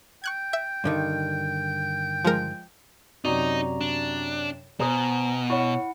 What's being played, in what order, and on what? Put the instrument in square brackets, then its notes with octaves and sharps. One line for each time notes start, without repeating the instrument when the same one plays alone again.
[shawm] G5 [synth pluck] C#6 F#6 G#6
[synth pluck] E5
[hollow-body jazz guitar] G2 D3 D#3
[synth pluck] F3 G#3 A#4
[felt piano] F#2 C3 [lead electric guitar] D#4 [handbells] F#4 D5 A#5
[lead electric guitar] D4
[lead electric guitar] B2 [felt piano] C5 D#6 [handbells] G#5 A#5
[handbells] E4 F#5 [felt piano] C#5 C#6